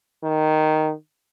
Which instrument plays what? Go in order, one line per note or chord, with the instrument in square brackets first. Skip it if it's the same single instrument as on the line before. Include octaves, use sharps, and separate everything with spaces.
[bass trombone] D#3